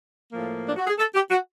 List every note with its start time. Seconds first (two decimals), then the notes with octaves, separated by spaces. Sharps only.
0.33 A2 F3 A#3
0.65 D4
0.76 F#4
0.87 G#4
0.98 A4
1.15 G4
1.31 F#4